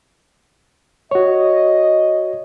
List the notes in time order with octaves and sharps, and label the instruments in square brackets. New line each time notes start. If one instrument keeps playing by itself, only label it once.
[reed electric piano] F#4 C#5 [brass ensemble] D#5